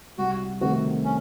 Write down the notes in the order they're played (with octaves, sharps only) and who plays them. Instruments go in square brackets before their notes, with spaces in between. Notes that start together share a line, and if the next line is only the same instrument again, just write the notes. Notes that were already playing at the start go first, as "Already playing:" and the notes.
[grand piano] C2 [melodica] F#4
[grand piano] C3 D#3 A3 C4 [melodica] F#4
[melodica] C#4